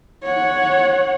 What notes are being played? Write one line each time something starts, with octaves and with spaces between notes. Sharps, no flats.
C#5 F#5